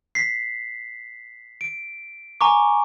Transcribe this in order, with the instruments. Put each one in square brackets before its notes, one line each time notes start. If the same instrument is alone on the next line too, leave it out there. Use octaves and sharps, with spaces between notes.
[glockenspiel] B6 C7
D7
G#5 A#5 C#6 D6